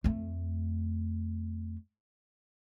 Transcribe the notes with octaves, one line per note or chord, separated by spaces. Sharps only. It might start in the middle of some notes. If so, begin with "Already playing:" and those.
F2 A3